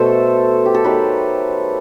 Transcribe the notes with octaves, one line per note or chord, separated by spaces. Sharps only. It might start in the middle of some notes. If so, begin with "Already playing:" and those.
Already playing: B2 A3 A4 C5
G4
A4
D#3 F#3 A3 G4 B4